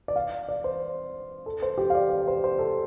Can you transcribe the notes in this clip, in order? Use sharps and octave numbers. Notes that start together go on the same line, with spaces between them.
D5
F5
D5
C5
A4
C5
G4
F5
D5
D5
C5
C5
A4